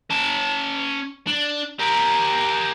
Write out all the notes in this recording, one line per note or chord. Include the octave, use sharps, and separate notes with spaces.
C#4 A5
D4
G4 A#4